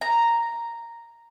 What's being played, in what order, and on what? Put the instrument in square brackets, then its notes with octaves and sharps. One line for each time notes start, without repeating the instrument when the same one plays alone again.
[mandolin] A#5